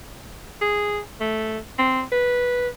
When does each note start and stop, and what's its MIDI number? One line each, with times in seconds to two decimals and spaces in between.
0.61 0.99 68
1.21 1.59 57
1.79 2.02 60
2.12 2.68 71